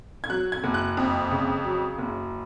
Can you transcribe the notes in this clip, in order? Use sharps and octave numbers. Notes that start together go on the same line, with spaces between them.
G#6
F#3 F#6
G#6
F#1
F#6
F2
C#3
F#3
F#1